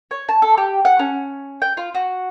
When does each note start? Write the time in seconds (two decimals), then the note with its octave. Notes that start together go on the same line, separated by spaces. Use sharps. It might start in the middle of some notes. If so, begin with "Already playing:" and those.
0.11 C#5
0.29 A5
0.42 A4
0.58 G4
0.85 F#5
0.99 C#4
1.62 G5
1.77 F4
1.95 F#4